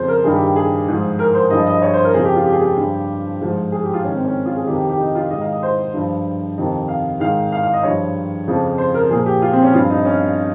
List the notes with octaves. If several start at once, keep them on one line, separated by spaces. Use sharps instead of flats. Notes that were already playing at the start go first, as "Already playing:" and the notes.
Already playing: F2 C#3 F3 C5
A#4
G2 D#3 G#4
G4
G#4
G#2 F3
A#4
C5
G2 F3 D#5
D#5
C#5
C5
A#4
F2 C#3 F3 G#4
G4
F4
G4
G#4
G4
G2 F3
G#2 F3
G#4
G4
F4
G#2 D#3 C#4
C4
C#4
F4
G#4
F2 C3 D#3 G4
G4
G4
D#4
F4
G#2 D#3 D#5
F5
D#5
C5
G2 F3
F2 C3 D#3
F5
G#2 D#3 F5
F5
F5
D#5
G2 F3 C#5
F2 C#3 F3
C5
A#4
A#2 F3 G#4
G4
F4
C4
C#4
G2 F3 F4
D#4
C#4